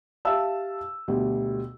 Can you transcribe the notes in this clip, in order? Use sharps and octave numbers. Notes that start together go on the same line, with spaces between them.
G4 E5 F5 A5 E6
D2 B2 G3